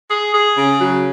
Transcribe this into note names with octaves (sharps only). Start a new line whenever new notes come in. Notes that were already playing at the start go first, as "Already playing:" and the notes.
G#4
G#4
C#3
F#3